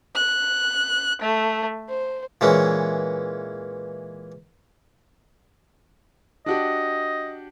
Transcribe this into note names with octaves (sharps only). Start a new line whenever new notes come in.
F#6
A3
C5
A#2 E3 G#3 C#4
D4 F#4 G4 D#5